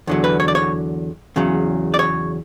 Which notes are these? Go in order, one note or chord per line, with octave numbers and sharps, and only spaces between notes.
E2 D3 F#3
B4
C#5
D5
C#5
E2 C#3 F#3
D5
C#5